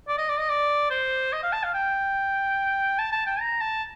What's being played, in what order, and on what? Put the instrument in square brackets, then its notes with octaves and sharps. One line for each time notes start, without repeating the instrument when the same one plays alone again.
[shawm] D5
D#5
D5
D#5
D5
C5
D#5
F5
A5
F5
G5
A5
A5
G5
A#5
A5